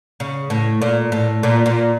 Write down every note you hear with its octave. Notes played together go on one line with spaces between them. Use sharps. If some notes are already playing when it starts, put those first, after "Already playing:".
C#3
A2
A#2
A2
A#2
A#2